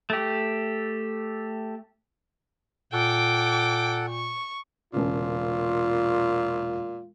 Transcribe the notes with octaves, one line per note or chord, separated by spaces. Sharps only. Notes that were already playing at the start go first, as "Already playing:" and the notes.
A3 G4
A#2 A4 F#5 G5 D6
C#6
E1 A#2 C#3 F4